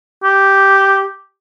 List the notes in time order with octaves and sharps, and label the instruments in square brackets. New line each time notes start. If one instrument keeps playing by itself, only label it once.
[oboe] G4